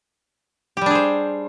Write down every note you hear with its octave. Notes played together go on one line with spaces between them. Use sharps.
G3 D4 G4 G#4 C5